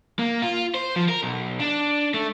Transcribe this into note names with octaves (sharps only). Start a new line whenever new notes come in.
A#3
F4
C5
F3
A#4
B1
D4
A3